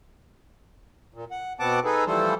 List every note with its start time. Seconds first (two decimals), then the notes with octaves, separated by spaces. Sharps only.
1.14 A#2
1.31 F#5
1.60 B2 B3 C4 F#5 A5 D6
1.85 D#4 G#4 A4 B4
2.07 E3 F3 G3 A3 A4 C5